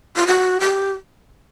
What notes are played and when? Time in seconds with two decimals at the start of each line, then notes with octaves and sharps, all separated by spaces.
0.16 F4
0.27 F#4
0.60 G4